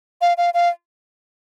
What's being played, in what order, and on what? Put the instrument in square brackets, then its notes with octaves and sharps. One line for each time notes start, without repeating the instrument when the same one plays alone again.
[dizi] F5
F5
F5